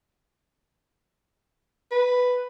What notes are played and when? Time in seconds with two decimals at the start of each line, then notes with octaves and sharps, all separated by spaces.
1.92 B4